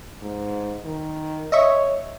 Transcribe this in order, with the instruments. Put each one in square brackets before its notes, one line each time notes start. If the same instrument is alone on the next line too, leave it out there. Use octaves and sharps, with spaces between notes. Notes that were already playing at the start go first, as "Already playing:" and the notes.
[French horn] G#2
D#3
[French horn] C#5 [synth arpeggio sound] D#5 E5 C#6